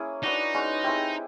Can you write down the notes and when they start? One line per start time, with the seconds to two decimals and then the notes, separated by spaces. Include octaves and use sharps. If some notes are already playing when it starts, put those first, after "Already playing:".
Already playing: A#3 C#4 E4 G#4
0.23 D4 D#4 F#4 B4 D5
0.54 G#3 C#4 F#4
0.84 G#3 C4 E4 G4